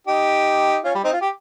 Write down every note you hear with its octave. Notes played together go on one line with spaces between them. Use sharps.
D#4 G4
C#4 F4
G3
C4 D#4
F4
G4